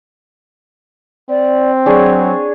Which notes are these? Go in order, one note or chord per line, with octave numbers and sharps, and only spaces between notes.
C4 D5
F#3 D4 G#4 C#5